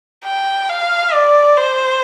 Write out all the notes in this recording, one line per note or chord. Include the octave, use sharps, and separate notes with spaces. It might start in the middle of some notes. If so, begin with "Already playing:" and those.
G5
F5
D5
C5